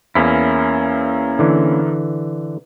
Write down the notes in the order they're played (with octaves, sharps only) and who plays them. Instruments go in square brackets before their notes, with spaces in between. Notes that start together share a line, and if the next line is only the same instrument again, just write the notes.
[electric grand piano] E2 B6 [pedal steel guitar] A#3 C#4 E4
[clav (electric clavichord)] D3 E3